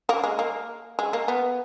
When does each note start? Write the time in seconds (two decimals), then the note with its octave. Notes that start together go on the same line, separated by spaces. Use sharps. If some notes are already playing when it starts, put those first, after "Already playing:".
0.09 A#3
0.24 G#3
0.39 A#3
0.99 G#3
1.13 A#3
1.28 B3